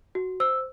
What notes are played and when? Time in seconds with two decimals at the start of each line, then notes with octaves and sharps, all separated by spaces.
0.15 F#4
0.40 C5 E6